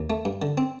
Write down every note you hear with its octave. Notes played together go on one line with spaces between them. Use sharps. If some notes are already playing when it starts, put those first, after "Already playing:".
Already playing: D#2
A3
G2
D3
C4